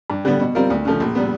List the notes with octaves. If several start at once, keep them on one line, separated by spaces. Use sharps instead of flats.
G2
D3 G3 B3
B2
G3 C4 F4 A#4
D2
C#3 F3 A3
A#1
A#2 G3 B3